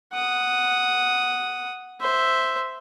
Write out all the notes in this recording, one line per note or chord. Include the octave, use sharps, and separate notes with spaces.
F#5 D#6
C5 E5